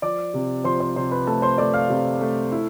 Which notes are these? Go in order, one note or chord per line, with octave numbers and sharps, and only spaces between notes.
F3 D5 D6
C3
F3 C5 C6
C5 C6
C3 C5 C6
B4 B5
A3 A4 A5
C5 C6
A3 D5 D6
F5 F6
C3
A3
E4